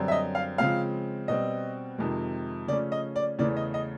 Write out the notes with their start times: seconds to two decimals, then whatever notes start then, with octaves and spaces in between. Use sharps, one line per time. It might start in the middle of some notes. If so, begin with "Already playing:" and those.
Already playing: F#2 D3 G3 C4
0.08 E5
0.12 D#5
0.35 F5
0.58 C#3 F3 G#3 C4 F5
1.28 B2 G3 C4 D#5
1.98 F2 C3 D#3 G#3
2.68 C#3 F3 A3 C#4 D5
2.92 D#5
3.16 D5
3.39 E2 C#3 E3 A3 D5
3.57 D#5
3.74 D#5